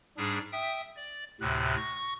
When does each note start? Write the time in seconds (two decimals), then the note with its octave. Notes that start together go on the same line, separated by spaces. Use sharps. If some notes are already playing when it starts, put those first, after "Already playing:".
0.17 G#2 G3 D4 G#4
0.52 E5 G5 D#6
0.96 D5
1.40 D2 A2 C3 F#6
1.77 C#6 A#6